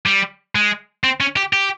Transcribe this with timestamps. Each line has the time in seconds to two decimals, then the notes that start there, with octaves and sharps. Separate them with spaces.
0.06 G3
0.55 G#3
1.04 C4
1.20 C#4
1.36 G4
1.53 G4